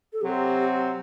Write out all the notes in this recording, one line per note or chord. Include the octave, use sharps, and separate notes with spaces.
A4
C3 F#3 C4 G4